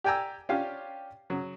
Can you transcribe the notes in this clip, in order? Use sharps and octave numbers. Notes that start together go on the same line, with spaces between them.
G4 D5 G5 G#5 A#5 E6
C#4 D4 F4 G4 C#5 F5
C#3 F#3